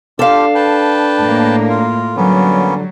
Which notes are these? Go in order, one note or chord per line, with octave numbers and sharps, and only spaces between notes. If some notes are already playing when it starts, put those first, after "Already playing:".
D4 F4 G4 A4 F5
B4 G5 A5
A2 A#3
F4
D3 F#3 G3 A#3 B3 C#4